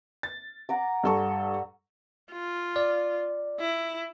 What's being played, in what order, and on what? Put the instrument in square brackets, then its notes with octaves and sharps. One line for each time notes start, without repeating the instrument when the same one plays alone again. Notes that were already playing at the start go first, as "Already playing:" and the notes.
[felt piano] A6
[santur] F#5 A#5 D6
[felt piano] G2 A4 C#6
[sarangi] F4
[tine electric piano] D5
[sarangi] E4